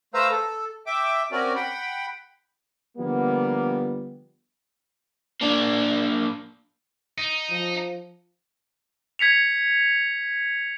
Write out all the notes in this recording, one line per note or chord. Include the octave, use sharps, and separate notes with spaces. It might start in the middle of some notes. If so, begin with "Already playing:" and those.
A3 B4 C5 F5 A#5 E6
A4
E5 G5 D6
C4 C#4 F#4 A#4 D5
F#5 G5 B5
D3 F3 G3 A#3 B3
A#3 D4
D#4
F3
G#6 B6 C#7 F7